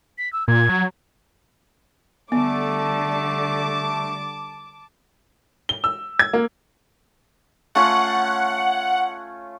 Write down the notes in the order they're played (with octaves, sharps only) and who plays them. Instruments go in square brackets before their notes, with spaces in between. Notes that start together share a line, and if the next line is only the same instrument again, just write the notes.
[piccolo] B6
E6
[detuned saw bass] A#2 [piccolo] G#6
[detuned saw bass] F#3
[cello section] D3 G3 [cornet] A3 [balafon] B3 [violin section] A5 D6
[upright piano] G7
E6
G#6
A#3
[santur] A3 C#4 F4 [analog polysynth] F#5